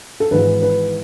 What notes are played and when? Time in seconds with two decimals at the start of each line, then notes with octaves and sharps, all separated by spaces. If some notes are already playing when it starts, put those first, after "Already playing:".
0.20 A4
0.31 G#1 G#2 E3 G#3 B4
0.62 B4